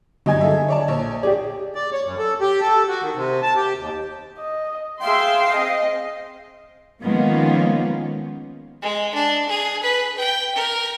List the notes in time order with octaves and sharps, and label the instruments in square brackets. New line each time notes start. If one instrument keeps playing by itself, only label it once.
[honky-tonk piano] G2 F#3 G#6 [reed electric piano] D3 D#5 G#5
[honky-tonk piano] G#4 A4 E5
C#5 D5 A5
A#1 C#5
[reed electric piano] G4 D5 [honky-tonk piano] G#4
[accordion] D5
C#5
F#2
A4
G4
A4
F#4
D#3
C3
A5
G4
D#2
[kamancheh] D#5
[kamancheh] G#4 G5 [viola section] E5 C6 [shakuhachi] F5
[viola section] C4 D#5
[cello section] D#3 F3 G#3 A#3 B3 C#4
[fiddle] G#3
D4
G#4
B4
G5
A#4